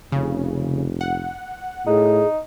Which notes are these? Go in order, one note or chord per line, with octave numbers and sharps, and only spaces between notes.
F1 C#3
F#5
A2 D#4 G#4